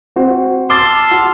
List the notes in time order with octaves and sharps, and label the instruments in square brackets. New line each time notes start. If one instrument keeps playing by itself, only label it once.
[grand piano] C4 F#4 C5
[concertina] A5 E6 F6 [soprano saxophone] C6 [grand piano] D6 A6
[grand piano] F#4